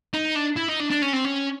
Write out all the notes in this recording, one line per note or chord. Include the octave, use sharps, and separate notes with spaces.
D#4
D4
E4
D#4
D4
D4
C#4
C4
C#4